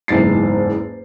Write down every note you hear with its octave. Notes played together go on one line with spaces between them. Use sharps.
F#1 E2 G#2 A6 C7